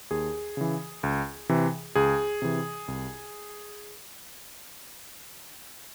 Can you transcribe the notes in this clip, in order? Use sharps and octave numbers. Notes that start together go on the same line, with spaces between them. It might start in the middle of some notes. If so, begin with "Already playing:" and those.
D#2 G#4
C#3 E3
C#2
C3 E3
C#2 G#4
C3 E3
C2